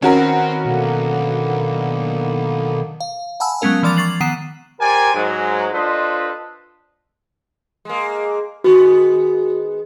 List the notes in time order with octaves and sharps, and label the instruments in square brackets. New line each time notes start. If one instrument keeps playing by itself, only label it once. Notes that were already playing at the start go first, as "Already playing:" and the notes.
[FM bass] D#3 [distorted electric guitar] C4 [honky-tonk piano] C#4 F#4 A#4 [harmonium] B4
[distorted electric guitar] B1 [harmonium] D3 A#3 B3
[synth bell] F5
F#5 G#5 A5 B5 E6
F#3 G#3 B3 C#4 A#4 F5
E3 F3 D5 D6 A6 F7
C#6 D6 A6 C7 F#7
D#3 B3 F#5 C7 D#7 E7
[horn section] G4 A#4 C5 D5 G#5
G#2 F#3 G#3
D4 F4 A4 B4 C5 D#5
[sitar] G#3 A#3
[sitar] D#3 G#3 B3 [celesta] F#4